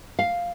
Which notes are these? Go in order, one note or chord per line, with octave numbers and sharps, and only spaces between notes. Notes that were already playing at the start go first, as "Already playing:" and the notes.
F5